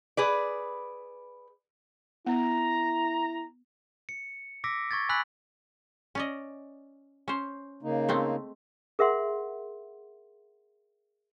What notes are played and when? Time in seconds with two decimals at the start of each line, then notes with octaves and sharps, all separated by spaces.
0.17 G#4 B4 D5
2.26 B3 E4 A#5
4.09 C#7
4.64 D6 E6 A#6 B6 D7
4.91 C#6 G#6 A6
5.09 G#5 B5 E6 F#6 B6 F#7
6.15 C#4 D5 D#5
7.28 C#4 C5
7.83 C#3 A#3 D#4
8.09 G#3 A3 C4
8.99 G#4 A#4 E5 F#5 C6